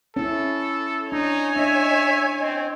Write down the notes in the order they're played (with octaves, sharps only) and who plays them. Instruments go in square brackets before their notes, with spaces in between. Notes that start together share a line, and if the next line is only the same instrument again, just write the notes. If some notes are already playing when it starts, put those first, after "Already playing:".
[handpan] C#4 E4 [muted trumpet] A4
[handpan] D4 [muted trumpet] D#4 [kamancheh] C#5 G#5
[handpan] D4 [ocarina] D#5 [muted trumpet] E5
[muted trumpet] C4 [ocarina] D#5